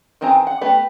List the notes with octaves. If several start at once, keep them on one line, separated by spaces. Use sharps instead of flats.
D#3 E3 C4 G#4 A#5
F#5
A3 B3 G4 A4 B4